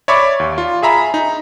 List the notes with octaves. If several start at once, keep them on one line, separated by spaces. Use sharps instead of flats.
C#5 D5 E5 B5 C#6 D6
D#2
F4
G#4 E5 A#5 B5
D#4